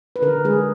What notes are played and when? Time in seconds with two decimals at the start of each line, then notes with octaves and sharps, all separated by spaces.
0.16 B4
0.22 D3 A#4
0.45 G#3 G#4